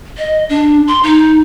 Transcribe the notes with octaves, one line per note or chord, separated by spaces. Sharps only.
D#5
D4
C6
D#4